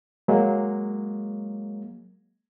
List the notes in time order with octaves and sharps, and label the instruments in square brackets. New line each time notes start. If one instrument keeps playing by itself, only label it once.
[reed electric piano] F#3 G#3 A#3